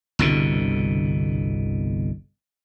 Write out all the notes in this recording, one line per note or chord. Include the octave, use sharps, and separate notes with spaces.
G1 C2 B2 D3